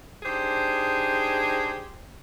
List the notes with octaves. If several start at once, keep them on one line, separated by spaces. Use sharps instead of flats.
D4 D#4 G4 G#4 C5